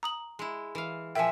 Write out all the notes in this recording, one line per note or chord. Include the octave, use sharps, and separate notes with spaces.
A#5 D#6 F#7
G#3 E4
E3 F5
A#2 F3 E5 G5 G#5